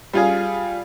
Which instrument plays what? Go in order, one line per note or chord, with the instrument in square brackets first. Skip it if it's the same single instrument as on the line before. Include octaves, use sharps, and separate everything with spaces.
[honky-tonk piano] G3 F4 G#4